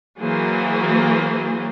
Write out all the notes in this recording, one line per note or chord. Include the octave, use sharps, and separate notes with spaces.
E3 F#3 A#3 G#4 C5